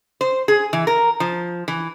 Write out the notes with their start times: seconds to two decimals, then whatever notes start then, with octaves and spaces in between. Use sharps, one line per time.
0.21 C5
0.48 G#4
0.73 E3
0.87 A#4
1.20 F3
1.68 E3